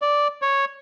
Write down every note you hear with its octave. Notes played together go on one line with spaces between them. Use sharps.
D5
C#5